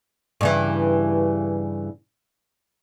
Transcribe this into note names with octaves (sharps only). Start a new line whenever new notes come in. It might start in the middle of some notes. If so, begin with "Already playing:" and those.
G2 C#3 E3